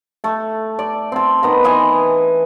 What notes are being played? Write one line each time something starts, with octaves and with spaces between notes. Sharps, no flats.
A3 A5
D5
C4 A5
D#3 B3 A#5
E3 D#5 G#5 C6